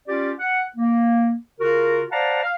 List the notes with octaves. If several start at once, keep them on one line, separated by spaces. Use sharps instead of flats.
C#4 F4 G4 D5
F#5
A#3
C#3 F4 F#4 A#4
C5 D5 F5 F#5 A5 A#5
F5